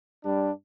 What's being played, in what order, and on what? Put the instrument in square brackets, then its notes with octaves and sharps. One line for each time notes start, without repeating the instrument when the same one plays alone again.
[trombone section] G2 G3 D4